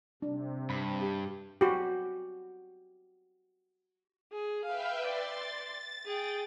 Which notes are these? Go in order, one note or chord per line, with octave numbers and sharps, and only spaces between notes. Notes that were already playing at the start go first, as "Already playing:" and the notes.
C3 D4
G2 B5
G4
F#4 G4
G#4
B4 E5 F5 G5
D5 C6 A6
G#4 G5